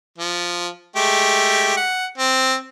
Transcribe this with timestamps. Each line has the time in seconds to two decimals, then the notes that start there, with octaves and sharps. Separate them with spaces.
0.18 F3
0.96 G#3 A3 G4
1.76 F#5
2.18 C4